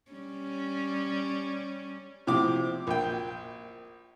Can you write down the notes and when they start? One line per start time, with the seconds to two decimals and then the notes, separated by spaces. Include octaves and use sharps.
0.12 G3 C#4
2.27 A2 C3 F3 D6
2.87 A#1 G5